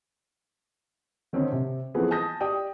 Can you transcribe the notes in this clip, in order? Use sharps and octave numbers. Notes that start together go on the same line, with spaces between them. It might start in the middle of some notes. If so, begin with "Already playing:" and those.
D3 D#3 C4 C#4 D#4
C3
E3 F3 B3 C4 G#4 A4
G#5 A5 D#6 G6 A#6
G4 D5 G5 D#6